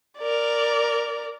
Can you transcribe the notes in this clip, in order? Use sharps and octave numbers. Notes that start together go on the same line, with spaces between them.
A#4 D5